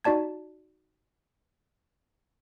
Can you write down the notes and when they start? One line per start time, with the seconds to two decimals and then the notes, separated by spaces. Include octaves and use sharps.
0.04 D#4 F#4 D5 A5 G#6